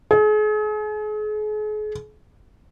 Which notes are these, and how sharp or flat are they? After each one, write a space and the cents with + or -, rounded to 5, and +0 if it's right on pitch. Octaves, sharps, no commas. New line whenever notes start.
G#4 +40